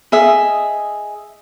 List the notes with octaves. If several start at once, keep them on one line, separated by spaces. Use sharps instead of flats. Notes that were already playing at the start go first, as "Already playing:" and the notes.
G#4 D#5 E5